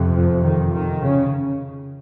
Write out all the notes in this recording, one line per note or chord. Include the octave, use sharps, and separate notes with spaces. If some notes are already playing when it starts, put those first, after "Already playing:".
Already playing: F2 C3
F3
D#3
D#3
C#3